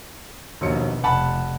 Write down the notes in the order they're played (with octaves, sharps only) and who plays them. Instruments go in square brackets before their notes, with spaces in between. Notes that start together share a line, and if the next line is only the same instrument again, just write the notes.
[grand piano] A#1 F#3 C#7 [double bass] D#2 B2
[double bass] F1 [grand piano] F#5 A5 B5